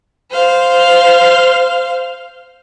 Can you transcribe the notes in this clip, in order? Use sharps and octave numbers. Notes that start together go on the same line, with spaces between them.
C5 F5